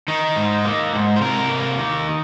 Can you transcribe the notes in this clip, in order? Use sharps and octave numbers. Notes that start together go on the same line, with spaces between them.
D#3 D#4
G#2
A#3
G#2
C5
C3 A#4
A#3
D#3